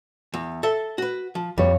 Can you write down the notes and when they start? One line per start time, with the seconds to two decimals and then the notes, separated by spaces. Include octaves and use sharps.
0.34 E2
0.63 A4 E5
0.98 F#4 B4
1.35 F3
1.58 F2 G3 C#5